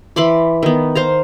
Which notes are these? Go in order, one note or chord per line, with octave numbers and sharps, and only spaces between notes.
E3 B5 C6 D6
D#3 B3
C5 F5 A#5